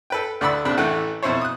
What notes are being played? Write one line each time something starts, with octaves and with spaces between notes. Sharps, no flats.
A4 B4 G5
D2 D5 F#5 B5 E6
A#1 C3 D4 B5
A1 E3 A3 F#5 G5
F2 B2 E4 C5 C#5
D#6 F#6